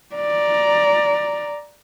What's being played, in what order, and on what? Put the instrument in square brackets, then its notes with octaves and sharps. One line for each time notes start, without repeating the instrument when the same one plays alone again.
[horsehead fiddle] D5 A#5